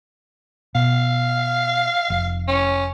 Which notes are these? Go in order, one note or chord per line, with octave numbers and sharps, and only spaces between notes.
B2 F5
F1
C#4